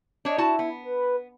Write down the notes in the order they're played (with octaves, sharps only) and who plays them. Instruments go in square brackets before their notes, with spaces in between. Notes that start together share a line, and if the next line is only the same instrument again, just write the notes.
[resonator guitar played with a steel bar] D4 C#5 [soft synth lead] D#5
[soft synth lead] E4 [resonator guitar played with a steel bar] F#4 A5
[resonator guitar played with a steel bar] B3
[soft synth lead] B4